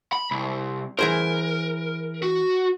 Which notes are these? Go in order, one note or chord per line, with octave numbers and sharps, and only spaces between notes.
B5
C2
E3 G#4 A#4 C5
F#4